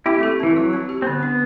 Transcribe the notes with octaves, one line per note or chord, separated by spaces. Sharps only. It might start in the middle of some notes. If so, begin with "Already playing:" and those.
C4 E4 G4
A3
G4
E3 C4
F#3 E4
C4
G4
C4
D3 B3
D4